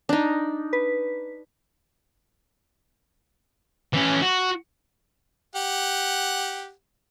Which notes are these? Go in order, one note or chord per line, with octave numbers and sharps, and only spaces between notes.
D4 D#4
B4
E3 C#4
F#4
G4 F#5